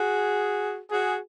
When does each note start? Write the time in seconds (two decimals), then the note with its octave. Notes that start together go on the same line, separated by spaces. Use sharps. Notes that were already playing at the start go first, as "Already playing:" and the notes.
Already playing: F#4 G#4
0.90 F#4 G#4